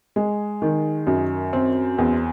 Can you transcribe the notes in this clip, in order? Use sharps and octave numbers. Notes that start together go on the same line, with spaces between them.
G#3
D#3
F#2
C4
E2